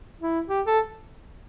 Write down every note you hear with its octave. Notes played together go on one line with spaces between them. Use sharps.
E4
G4
A4